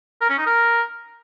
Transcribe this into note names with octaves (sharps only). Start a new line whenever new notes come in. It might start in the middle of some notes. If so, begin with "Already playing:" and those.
A#4
C#4
D#4
A#4